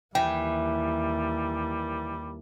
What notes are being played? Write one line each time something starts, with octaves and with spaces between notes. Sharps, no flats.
D#2 E3 G3 G5